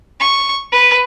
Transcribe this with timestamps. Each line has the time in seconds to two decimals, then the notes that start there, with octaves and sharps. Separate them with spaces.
0.20 C#6
0.72 B4